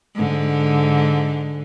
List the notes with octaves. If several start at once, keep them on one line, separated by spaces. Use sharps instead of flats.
G#2 D3